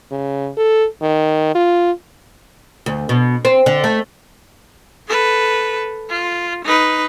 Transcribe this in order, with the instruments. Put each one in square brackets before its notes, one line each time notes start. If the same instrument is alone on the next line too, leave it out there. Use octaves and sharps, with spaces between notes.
[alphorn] C#3
A4
D#3
F4
[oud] D2
B2
C4
D3
A3
[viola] A4 B4
F4
D#4 B4